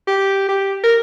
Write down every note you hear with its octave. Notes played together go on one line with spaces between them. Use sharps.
G4
G4
A#4